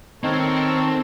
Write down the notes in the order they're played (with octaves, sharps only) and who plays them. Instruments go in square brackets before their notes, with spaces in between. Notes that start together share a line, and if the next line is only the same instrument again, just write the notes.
[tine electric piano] D#3 D#4 [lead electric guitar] C4 [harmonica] A4 A#4 C#5